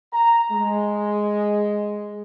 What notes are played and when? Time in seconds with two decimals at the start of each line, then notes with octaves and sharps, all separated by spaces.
0.13 A#5
0.51 G#3